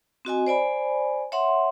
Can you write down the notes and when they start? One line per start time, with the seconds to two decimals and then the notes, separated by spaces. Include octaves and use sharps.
0.25 C4 F#4 D#5 G#5
0.47 C5 D5 G#5 B5
1.32 C#5 E5 F#5 C6